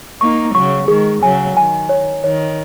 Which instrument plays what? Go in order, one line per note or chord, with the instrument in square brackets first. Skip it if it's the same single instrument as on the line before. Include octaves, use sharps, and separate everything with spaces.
[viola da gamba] A#3 D#4 [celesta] C#6
[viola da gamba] C#3 F#3 [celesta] C#6
[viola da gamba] D#3 G#3 [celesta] G#4
[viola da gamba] C#3 F#3 [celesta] G#5
[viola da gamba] D#3 [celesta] G#5
[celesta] C#5
[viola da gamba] D#3 [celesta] C#5